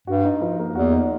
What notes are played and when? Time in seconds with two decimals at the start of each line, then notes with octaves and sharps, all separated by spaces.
0.07 G2 F#4
0.25 D#4
0.41 F3
0.59 A#3
0.75 E2 F#4
0.92 D#4